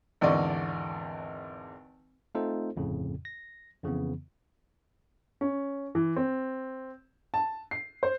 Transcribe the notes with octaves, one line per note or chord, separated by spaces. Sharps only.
G#1 E2 D3 D5 D#5 C#6
A3 C4 D#4 F4 A4 C5
G1 F2 A2 C#3
A#6
F2 C#3 E3 B3
C#4
E3
C4
A5
C7
C5